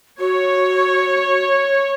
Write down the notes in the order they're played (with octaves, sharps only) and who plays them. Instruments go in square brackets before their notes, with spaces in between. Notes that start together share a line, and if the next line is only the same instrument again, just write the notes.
[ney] F#4 [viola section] C#5